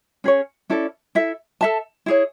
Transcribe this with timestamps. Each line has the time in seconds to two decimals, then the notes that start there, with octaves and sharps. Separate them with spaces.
0.24 C#4 G#4 C#5
0.70 C#4 E4 A4 D5
1.15 E4 A4 E5
1.61 A4 E5 A5
2.06 E4 G#4 C#5